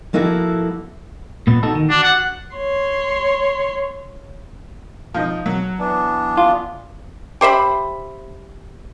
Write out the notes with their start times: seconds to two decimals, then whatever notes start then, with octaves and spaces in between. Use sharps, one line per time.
0.13 F3 A#3 E4 F#4 G#4 A4
1.47 A#2 B3
1.63 D#4 F#4 A4
1.75 D#3
1.90 D4 F#4
2.03 F#5
2.55 C#5 C6
5.14 F3 D#4
5.46 F#3
5.79 E3 B3 D4
6.37 F4
7.41 G4 C5 E5 B5